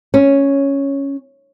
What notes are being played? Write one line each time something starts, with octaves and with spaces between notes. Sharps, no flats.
C#4